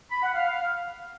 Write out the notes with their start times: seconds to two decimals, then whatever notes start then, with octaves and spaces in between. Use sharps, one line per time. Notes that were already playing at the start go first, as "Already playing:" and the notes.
0.11 B5
0.23 F#5
0.35 F5